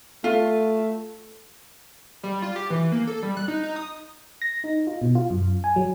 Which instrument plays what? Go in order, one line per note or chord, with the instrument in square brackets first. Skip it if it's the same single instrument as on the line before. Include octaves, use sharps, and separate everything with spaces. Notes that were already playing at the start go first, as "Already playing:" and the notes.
[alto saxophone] A3 [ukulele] F4
[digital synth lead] G3
F4
G4
E3
A#3
A4
G3
F#6
D#4
D#4
D#6
[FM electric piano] A#6
D#4
F4
B2
F4
F#2
G#5
F#3